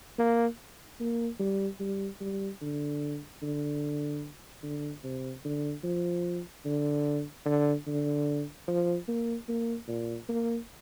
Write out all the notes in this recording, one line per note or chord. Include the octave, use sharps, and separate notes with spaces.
A#3
A#3
G3
G3
G3
D3
D3
D3
C3
D3
F3
D3
D3
D3
F3
A#3
A#3
A#2
A#3